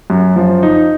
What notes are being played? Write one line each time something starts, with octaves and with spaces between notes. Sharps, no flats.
F#2
F3
D#4